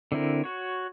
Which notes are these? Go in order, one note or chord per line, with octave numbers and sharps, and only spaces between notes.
D3 C4 E4 A#4
F#4 C#5